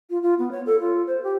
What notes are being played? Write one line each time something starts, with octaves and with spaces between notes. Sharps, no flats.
F4
F4
B3
C#5
A4
F4
C5
G4